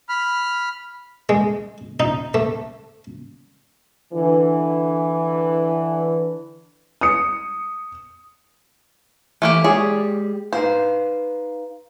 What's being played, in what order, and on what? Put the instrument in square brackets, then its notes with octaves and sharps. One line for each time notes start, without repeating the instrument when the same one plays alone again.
[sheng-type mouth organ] B5 F6
[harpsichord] G#3
D#4
A3
[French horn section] D3 E3
[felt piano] D#6 C#7
[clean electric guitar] E3 [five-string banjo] A3 A#3 G4
[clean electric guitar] G#3 G4 [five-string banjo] G#4 C#5 D5
[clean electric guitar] D#4 B4 F5 [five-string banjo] C5